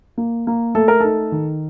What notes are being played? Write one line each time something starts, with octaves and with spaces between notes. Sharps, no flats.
A#3
A#3
A3 A4
A#4
D#4 A4
D#3